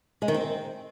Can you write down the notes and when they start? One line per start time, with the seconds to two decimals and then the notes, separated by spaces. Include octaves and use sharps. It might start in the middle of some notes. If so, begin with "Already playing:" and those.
0.22 G#3
0.28 D#3
0.34 C4